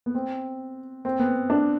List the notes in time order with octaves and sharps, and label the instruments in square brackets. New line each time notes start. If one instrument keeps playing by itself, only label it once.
[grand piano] B3
C4
C4
B3
D4